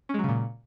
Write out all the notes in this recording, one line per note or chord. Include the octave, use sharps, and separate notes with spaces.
A#2 C#3 F#3 G#3 C#4